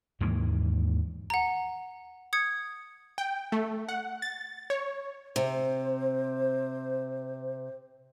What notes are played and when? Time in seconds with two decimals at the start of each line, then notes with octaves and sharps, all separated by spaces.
0.20 D#2 G#2 E3 A#3
1.30 F#5 A#5
2.33 D#6 G#6 C#7
3.18 G5
3.52 A3
3.89 F#5
4.22 A6
4.70 C#5
5.36 C3 C5